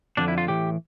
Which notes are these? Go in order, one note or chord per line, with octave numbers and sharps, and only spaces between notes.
F2 D3 F3 D4
E4
F4
A2 E3 G4